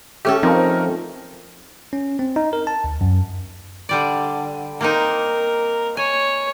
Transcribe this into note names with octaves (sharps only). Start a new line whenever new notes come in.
A3 C#4 G4 A4
F3 C4 D#4 A#4
C#4
C4
D#4
A#4
A5
D2
F#2
D3 G3 D5
A#3 C4 D#4 A#4
C#5 G#5